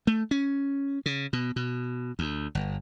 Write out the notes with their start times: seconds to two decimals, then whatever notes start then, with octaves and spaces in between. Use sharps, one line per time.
0.07 A3
0.31 C#4
1.06 C#3
1.33 B2
1.56 B2
2.19 D2
2.55 G1